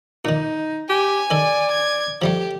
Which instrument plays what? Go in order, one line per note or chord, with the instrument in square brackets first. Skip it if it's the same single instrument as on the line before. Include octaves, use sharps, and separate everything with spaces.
[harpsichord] A#2 D#3 [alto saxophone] D#4
[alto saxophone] G4 [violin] G#5
[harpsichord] D#3 A4 [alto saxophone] D5
[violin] G#6
[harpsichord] F3 G3 A3 [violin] G4